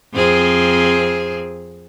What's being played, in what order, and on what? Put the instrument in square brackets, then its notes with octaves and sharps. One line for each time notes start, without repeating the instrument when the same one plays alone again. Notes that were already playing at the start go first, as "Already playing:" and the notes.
[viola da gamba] F2 C4 G#4